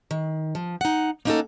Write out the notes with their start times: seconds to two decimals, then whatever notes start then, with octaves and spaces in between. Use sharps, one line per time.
0.11 D#3
0.55 F3
0.81 D#4 F#5
1.25 A#3 C#4 D#4 F4 F#4 A4